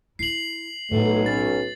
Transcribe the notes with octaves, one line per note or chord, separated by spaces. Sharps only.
E4 C7 F#7
B1 A2 F#3 A3
C#4 A6